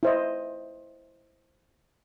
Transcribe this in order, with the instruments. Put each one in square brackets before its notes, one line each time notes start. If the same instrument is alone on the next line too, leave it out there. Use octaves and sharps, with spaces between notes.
[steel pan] E4 C5 D#5